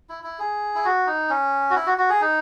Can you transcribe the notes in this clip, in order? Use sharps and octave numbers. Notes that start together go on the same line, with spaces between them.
E4
E4
G#4
E4
F#4
D#4
C#4
F#4
E4
F#4
F#4
G#4
D#4